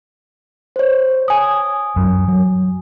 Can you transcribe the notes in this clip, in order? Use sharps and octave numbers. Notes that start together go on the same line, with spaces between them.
C5 C#5
G#5 D#6
F#2 F#3
F#3